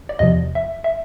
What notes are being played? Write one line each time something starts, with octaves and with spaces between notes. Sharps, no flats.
D5
E2 C3 F3 D#5
E5
E5